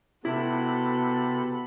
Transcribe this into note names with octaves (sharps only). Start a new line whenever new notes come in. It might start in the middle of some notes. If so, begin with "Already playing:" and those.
C3 B3 E4 F#4 A4 B5